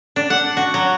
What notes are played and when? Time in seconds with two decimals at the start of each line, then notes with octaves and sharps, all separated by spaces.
0.16 D4
0.30 F#5
0.57 F#4
0.74 F#3